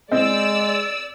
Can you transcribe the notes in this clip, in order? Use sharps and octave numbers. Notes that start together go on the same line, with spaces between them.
G#3 C4 D5 D#5 E6